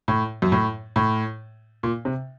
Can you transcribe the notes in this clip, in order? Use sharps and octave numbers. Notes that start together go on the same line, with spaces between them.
A2
F#2
A2
A2
A#2
C3